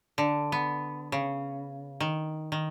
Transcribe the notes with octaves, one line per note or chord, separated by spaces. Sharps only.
D3
B3
C#3
D#3
D#3